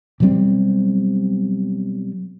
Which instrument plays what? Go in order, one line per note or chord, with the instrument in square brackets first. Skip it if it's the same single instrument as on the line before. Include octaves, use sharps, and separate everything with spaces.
[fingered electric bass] B2 F#3 G3 C4